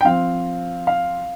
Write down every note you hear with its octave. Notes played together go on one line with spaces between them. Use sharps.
G5
F3 C4 F5
F5